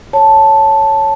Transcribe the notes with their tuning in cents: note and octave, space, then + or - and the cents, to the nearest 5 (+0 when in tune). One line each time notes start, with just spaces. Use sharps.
C#5 +0 A5 +0